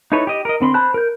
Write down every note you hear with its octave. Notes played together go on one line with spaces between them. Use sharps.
D#4 E4 A4 B4 C#5
G4 D#5
A#4 D#5
D3 C4 B5 C6
C5 A5 B5 F#6
A#4 G6